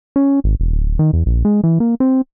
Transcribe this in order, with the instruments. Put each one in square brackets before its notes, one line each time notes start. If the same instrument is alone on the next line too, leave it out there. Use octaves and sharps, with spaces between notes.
[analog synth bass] C#4
G#1
E1
D1
D#3
E2
A#1
G#3
E3
A#3
C4